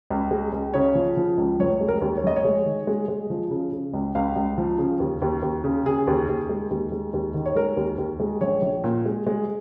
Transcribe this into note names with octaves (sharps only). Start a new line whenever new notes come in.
C#2
G#3
C#2
C#3 C#5
F3
F3
C#2
F1 C#5
G#3
A#4
D#2
C#5
F1 D#5
C#5
G#3
D#3
G#3
G#3
F3
C#3
C#3
C#2
C#2 F5
C#2
F3
C#3
D#2
D#2
D#2
C#3
C#3 G#4
D#2
D#2
G#3
D#2
G#3
D#2
D#3
C#5
G#3 A#4
D#2
D#2
G#3
A#1 C#5
A#1
A#2
G#3
G#3